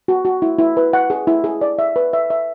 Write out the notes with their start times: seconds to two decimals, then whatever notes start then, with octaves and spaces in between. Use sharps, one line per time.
0.08 F#4
0.25 F#4
0.42 E4
0.59 E4
0.77 B4
0.93 F#5
1.10 G#4
1.27 E4
1.44 G#4
1.61 D5
1.79 E5
1.96 B4
2.13 E5
2.30 E5